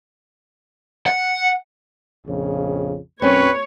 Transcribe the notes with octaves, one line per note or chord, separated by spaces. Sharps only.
F#5
A#1 F2 C#3
B1 F#2 C4 C#4 B4 C#5